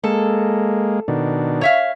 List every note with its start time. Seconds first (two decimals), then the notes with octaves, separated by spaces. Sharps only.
0.04 G#3 A#3 A4
1.08 B2 D#3 D4
1.61 C#5 E5 F5